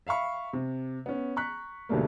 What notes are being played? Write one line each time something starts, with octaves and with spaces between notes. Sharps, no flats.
E5 F5 B5 C#6
C3
B3 C#4
A#5 C#6 F#6 B6
D2 G#2 B2 G3 A3 A#3